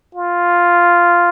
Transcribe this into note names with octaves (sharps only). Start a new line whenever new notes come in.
F4